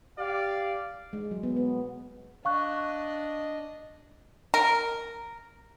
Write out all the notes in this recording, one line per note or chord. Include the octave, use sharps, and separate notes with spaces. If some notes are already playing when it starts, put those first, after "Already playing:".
G4 D5 F5
G#3
F#3
B3
B3
D4 D#5 F5 C#6 F#6
A#4